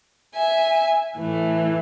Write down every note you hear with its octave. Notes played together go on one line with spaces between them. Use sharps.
E5 G#5
A2 E3 A3